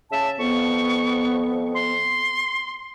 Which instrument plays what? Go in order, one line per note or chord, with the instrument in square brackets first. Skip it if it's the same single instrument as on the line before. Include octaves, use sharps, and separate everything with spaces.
[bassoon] C#3 [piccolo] E5 [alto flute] A5
[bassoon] F2 [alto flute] B3 [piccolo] C#6
[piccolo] C6